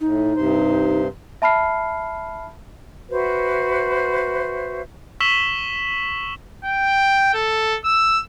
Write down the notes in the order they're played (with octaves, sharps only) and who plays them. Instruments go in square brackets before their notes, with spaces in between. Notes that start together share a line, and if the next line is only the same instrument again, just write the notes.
[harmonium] A2 [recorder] D#4
[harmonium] G2 C3 C5
[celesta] E5 A5 B5 F6 C7
[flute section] F#4 B4 C5 E5
[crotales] C#6 E6 B6 E7 F#7 G7
[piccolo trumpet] G5
A4
E6